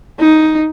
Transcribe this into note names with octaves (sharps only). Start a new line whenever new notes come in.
D#4